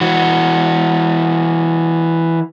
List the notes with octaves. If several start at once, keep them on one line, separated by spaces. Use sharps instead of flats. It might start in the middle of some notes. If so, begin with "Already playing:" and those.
E3 F#4